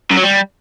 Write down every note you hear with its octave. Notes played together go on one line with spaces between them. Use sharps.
F#2
F#3
G3